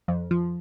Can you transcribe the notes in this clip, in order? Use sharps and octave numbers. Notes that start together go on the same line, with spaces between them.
F2
F3